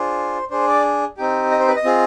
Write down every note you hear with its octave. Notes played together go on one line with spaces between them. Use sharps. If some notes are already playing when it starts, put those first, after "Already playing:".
Already playing: D4 F4 G#4 C5
D4 G#4 C5
D5
C4 D#4 G4
D#5
C5
B4
D#5
C4 F4 G#4